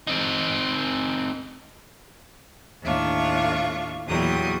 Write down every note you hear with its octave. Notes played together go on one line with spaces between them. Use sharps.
C4 D#4
D#2 A2 A3 D4 F4 C#6
E2 A#2 F#3 G3 D#6